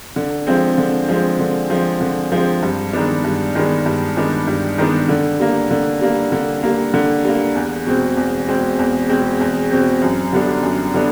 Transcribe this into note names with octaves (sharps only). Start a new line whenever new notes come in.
D3
F3 G#3 C4
D3
F3 G#3 C4
D3
F3 G#3 C4
D3
F3 G#3 C4
G2
D#3 G#3 B3 D4
G2
D#3 G#3 B3 D4
G2
D#3 G#3 B3 D4
G2
D#3 G#3 B3 D4
D3
G3 A#3
D3
G3 A#3
D3
G3 A#3
D3
G3 A#3
E2
B2 G#3 C4
E2
B2 G#3 C4
E2
B2 G#3 C4
E2
B2 G#3 C4
F#2
D3 G3 B3 D4
F#2
D3 G3 B3 D4